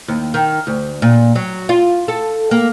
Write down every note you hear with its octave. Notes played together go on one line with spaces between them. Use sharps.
D#2
D#3
D2
A#2
F#3
F4
A4
A#3